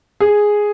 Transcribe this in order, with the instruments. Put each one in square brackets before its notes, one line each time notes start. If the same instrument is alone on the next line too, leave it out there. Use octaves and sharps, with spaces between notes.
[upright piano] G#4